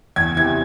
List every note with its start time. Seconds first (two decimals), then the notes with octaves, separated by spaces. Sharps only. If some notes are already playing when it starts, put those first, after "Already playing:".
0.16 E2 G#6
0.36 C3 E3 G#6